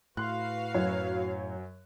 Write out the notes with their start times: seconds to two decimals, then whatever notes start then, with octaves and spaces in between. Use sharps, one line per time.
0.17 A2 F#4 B4 F5 C6 F#6
0.74 F#2 F#3 C#5